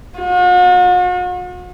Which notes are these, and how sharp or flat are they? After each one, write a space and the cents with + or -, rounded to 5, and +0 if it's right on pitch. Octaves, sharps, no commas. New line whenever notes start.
F#4 -45